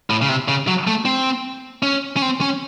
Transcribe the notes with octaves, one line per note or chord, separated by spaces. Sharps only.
A2
C#3
C3
C#3
F#3
A3
C4
C#4
C#4
C4
C#4